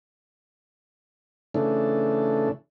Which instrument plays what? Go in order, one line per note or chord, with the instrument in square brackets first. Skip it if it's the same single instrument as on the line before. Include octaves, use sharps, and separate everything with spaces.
[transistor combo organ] C#3 E3 A3 D4